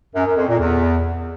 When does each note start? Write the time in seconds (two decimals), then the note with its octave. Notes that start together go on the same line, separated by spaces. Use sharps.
0.15 F#2
0.26 F#2
0.37 F2
0.48 A#2
0.59 E2